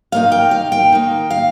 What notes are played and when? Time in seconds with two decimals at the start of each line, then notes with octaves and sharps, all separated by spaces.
0.12 D#3 A#3 D#4 F5
0.32 G5
0.51 F5
0.72 G5
0.92 D#3 A#3 D#4
1.30 F5